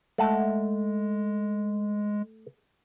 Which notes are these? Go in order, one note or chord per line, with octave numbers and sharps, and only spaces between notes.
G#3 A3 F#5 A5